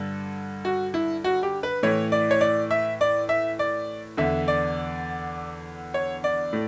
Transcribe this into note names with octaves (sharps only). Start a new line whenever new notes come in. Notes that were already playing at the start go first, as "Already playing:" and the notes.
Already playing: G2 D3
F#4
E4
F#4
G4
B4
A2 E3 C#5
D5
C#5
D5
E5
D5
E5
D5
E2 D3 E5
D5
C#5
D5
A2